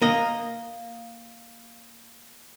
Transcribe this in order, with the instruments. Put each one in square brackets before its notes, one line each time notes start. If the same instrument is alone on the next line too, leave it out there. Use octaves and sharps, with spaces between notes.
[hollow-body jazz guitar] A#3 D#5